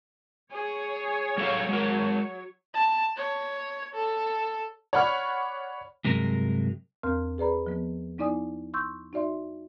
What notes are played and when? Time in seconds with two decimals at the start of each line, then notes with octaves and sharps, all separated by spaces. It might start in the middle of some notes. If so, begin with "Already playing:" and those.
0.52 G#4 C#5
1.38 F#3 G3 A4 F5
1.69 G#3 A#4
2.74 A5
3.17 C#5
3.94 A4
4.93 C#5 D5 F#5 B5 C#6 F6
6.04 G2 C3 F#3 G#3 A#4
7.03 E2 C4 A#4 C6 F6
7.38 G#4 B4 D5 A#5 B5
7.66 F3 B3
8.18 B3 D#4 E4 D5 G#5 D#6
8.74 C6 C#6 E6 G6
9.13 D#4 F#4 D5 E5 C6